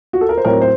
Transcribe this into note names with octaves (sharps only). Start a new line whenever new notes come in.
F#4
A4
A#4
C5
A2 F#3 C4 A#4 C#5
C5